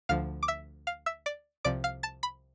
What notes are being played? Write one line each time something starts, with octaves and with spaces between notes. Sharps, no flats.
D2 D3 F3 F5 F6
D6
E5 E6
F5 F6
E5 E6
D5 D6
C2 C3 F3 D5 D6
F5 F6
A5 A6
B5 B6